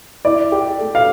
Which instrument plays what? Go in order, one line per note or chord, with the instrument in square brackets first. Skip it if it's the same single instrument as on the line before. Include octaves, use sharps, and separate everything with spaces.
[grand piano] E4 [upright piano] D5
[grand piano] G4
A3
[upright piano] F5